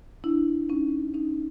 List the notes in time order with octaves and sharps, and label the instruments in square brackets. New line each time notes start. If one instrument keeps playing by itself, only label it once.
[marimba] D4 E4
C#4 D#4
C#4 D#4